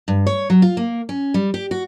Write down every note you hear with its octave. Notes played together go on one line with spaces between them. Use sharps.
G2
C#5
F#3
F4
A#3
C#4
G3
G4
F#4